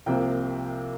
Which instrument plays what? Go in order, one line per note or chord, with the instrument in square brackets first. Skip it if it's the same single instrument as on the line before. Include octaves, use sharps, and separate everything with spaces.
[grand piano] C2 C3 F3 A#3 G5